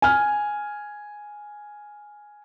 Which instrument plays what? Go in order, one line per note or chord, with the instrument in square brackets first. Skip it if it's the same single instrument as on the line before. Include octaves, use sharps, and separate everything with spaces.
[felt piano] G#5 F6